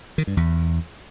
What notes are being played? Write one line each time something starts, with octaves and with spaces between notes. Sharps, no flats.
D#3
G2
E2